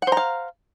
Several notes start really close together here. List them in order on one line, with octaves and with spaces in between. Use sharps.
F#5 C5 A#5 F5